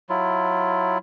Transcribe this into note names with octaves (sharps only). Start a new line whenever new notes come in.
F#3 E4 F4